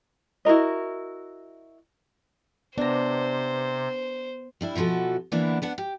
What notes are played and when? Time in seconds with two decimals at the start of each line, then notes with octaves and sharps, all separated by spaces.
0.45 E4 F#4 A#4 D#5
2.78 C3 B3 D4 C5 A#5
4.61 G3 D4 E4
4.75 B2 E3 F3 F#4 A4
5.32 D3 E3 A#3 B3 D4 E4
5.62 B3 D4 F#5
5.78 G4